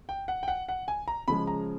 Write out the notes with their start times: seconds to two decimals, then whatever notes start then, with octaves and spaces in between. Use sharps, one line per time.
0.09 G5
0.28 F#5
0.43 G5
0.48 F#5
0.69 F#5
0.88 G#5
1.08 A#5
1.28 C#3 F3 G#3 B5
1.47 A#5